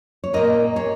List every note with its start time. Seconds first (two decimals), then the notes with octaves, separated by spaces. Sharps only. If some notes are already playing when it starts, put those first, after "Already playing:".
0.24 C#5
0.33 A#2 A#3 A#4 D#5
0.76 G#4 C#5